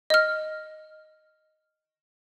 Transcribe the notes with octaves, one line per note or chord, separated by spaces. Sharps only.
D#5 F6